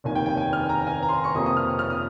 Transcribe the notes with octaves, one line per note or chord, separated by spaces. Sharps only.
F1 D#2 D#3 G#5
G5
G5
G#5
F6
A#5
G#5
A#5
C6
A#5
C#6
F2 C3 F3 A#3 D#6
D#6
F6
F6
D#6